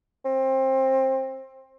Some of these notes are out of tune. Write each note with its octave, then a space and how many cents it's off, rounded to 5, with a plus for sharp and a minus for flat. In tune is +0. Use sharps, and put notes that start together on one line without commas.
C4 +20